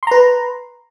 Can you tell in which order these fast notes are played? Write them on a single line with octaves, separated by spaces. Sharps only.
C6 A#5 B4